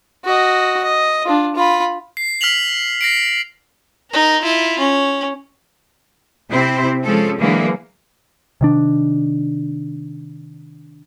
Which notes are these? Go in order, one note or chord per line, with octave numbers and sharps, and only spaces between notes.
F#4 D#5
D#5
D4 F4
F4 B5
C7
F6 B6 C7 F7 F#7
A#6 C7 D7
D#4 A#4
E4 F4
C#4
C3 C4 E4 C5
F3 G#3 C#4 A4
D3 E3 F#3 G#3 A#3
C3 D#3 D4